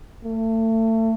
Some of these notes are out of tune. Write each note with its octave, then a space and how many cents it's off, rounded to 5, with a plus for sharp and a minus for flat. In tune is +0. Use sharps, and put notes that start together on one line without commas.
A3 +30